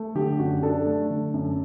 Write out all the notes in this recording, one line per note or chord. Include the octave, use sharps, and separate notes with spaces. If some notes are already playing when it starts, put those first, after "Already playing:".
Already playing: A3
D3 G4
F#2 F#4
D4 A4
A3
D3
F#2